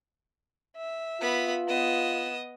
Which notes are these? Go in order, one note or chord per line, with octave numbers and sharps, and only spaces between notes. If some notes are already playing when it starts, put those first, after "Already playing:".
E5
B3 F4 B5
B3 D#5 E7